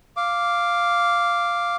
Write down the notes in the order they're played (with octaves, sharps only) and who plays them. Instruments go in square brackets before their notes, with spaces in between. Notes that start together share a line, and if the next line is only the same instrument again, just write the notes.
[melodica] F5 D6